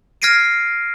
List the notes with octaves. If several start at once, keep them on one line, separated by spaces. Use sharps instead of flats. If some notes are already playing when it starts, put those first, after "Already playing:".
F6 G#6 A#6 C7 D7 D#7